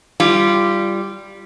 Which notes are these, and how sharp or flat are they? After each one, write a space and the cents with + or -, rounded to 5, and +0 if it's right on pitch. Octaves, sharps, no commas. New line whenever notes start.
G3 +0 F4 -25